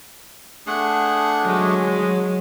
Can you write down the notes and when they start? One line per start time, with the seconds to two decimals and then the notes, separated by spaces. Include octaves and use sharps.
0.67 A3 D4 G#4 F#5
1.47 F#3 G#3